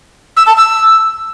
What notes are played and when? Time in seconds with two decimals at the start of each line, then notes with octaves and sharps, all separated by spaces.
0.37 E6
0.47 A5
0.57 E6